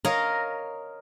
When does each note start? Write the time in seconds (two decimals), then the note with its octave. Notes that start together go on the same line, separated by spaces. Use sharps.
0.05 A#4 C#5 D#5 F5 A#5